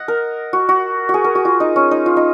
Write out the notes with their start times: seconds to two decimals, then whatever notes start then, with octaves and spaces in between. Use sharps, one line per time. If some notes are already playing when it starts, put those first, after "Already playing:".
Already playing: D#5 F#5
0.08 A#4
0.53 F#4
0.69 F#4
1.09 F#4 G#4
1.24 A#4
1.35 F#4
1.45 F4
1.60 D#4
1.76 C#4
1.91 D#4
2.06 F4
2.17 D#4